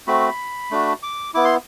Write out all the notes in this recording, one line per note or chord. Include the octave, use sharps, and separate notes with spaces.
A3 C4 F#4 B5
A3 D4 F#4
D6
B3 E4 D6
C6